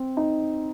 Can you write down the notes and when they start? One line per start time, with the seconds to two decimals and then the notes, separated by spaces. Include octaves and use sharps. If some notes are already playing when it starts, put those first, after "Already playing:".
Already playing: C4
0.17 D#4